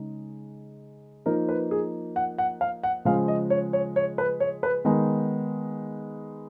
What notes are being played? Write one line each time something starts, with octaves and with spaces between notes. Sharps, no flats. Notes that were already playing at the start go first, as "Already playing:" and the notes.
Already playing: C#3 G#3 D#4
F3 A#3 D#4 A#4
B4
G#4
F#5
F#5
F5
F#5
C#3 F3 G#3 F5
D#5
C#5
C#5
C#5
B4
C#5
B4
D#3 G#3 B3 D#4